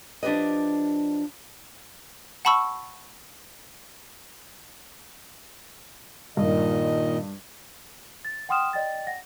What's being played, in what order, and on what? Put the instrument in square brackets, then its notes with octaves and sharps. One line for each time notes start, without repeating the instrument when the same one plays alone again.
[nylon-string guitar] F3 D4 G4 B4 D#5
[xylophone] F#5 A5 B5 C#6 E6
[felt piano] G2 [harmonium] A#2 D#3 D#5
[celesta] A6
F#5 G5 C6 D#6 F6 E7
D5 D#5 G5 A6
F#5 A#6